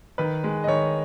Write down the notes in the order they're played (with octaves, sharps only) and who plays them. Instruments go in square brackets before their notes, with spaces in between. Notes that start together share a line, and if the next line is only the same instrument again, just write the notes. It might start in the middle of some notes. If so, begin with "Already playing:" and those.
[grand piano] D#3 B4
G#3
D#5
D#3 C#5